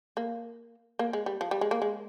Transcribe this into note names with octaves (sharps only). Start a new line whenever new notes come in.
A#3
A#3
G#3
G3
F3
G3
G#3
A#3
G#3